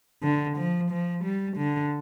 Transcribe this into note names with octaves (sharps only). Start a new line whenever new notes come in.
D3
F3
F3
G3
D3